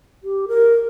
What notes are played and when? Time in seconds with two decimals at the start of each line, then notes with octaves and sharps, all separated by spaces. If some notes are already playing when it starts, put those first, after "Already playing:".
0.24 G4
0.48 A#4